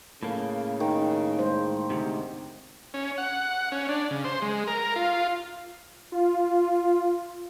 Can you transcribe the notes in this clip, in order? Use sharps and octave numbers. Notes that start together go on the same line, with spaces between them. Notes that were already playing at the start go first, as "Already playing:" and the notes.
A2 C#3 A#3
D#3
G#3 C5
D2 G#2 C3
C#4
F#5
C#4
D4
C#3
C5
G#3
A#4
F4
F4